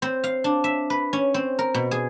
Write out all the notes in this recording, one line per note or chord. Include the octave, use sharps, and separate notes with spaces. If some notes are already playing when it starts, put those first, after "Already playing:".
C4
F5
D4
E5
B4
C#4
C4
A#4
B2
G#4